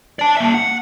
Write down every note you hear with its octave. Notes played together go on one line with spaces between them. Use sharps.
D5 A5
A#3 E5
F#5